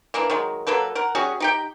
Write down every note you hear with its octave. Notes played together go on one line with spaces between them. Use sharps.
E3 A#3 D4
D#3 F#3 G#3
F#3 A#3 A4 B4
A#4 F#5
G3 C#4 F#4 G#4
D#4 G4 G5